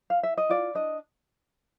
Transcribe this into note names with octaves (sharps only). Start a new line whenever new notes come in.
F5
E5
D#5
F4 D5
D4 D#5